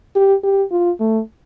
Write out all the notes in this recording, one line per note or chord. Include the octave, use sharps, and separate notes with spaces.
G4
G4
F4
A3